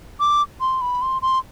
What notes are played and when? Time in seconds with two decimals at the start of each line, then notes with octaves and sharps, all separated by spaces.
0.20 D6
0.61 C6
0.81 B5
1.02 C6
1.22 C6